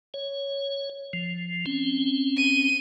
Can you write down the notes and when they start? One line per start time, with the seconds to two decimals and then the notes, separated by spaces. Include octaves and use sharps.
0.14 C#5
1.13 F3
1.66 C4 C#4
2.37 D#7